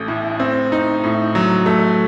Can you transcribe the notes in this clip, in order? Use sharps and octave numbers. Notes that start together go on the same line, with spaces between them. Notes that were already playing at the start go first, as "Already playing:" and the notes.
Already playing: A1 A3 C#4
A2
C4
D#4
A2
F#3
A3